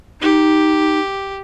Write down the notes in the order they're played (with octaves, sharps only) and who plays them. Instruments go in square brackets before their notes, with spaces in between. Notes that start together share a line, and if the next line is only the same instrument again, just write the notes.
[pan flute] D#4 [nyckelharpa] G4